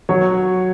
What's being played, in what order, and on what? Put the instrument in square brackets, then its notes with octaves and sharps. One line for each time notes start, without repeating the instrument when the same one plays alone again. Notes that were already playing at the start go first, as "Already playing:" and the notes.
[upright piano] F#3 C#5